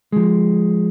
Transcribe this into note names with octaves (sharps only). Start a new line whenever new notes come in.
F3 G#3